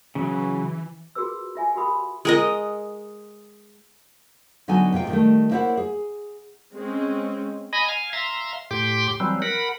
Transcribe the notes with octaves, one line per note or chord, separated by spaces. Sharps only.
C#3 E3 F#3
F4 F#4 G#4 A#4 B4 E6
F4 E5 G#5
F#4 G4 A#4 F#5 B5 D#6
G#3 A#4 D#5
D3 F#3 B3 D#4 A4 G#5
G#2 C3 F4 G5
D#3 G3 A3
A#3 E4 C5 C#5 F5 F#5
G#4
G#3 C4 C#4
D#5 G#5 B5 A#6
F5 G#5
E5 F5 A#5 C6
A2 G4 G5 C6 D6
E3 F#3 G3 C4
A#4 F#5 B5